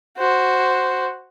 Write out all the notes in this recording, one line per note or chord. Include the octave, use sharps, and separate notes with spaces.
F#4 C5